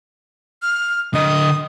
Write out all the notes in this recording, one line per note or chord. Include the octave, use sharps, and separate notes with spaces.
F6
D3 D#5 D#6